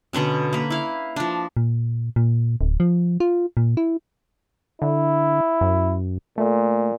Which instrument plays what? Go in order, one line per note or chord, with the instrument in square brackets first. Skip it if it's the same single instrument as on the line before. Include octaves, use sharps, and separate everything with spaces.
[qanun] B2 D3 B3 C#4
A#3 B4
E4 F5
F3 D4
[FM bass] A#2
A#2
D1
F3
F4
A#2
E4
[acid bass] D3 [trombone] E4
[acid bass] F#2
[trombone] A#2 [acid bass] A3